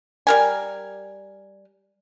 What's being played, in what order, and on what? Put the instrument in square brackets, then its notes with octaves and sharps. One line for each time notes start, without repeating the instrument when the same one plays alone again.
[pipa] G3 A#4 G#5